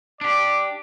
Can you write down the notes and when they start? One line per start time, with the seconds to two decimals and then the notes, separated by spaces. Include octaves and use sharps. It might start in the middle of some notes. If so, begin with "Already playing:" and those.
0.21 D4 G4 D5